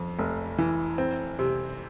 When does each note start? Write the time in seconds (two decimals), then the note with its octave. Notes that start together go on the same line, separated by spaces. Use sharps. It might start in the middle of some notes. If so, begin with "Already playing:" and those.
Already playing: F2
0.19 F1
0.58 E3
0.98 C4
1.39 C3